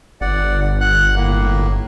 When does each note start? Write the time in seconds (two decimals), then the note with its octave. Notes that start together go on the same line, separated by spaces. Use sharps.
0.21 G1 D5 F#5
0.81 F#5 F#6
1.16 A2 A#3